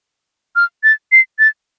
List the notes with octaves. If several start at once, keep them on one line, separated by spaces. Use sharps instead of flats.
F6
A6
C7
A6